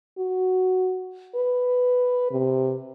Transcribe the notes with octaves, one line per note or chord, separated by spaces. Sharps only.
F#4
B4
C3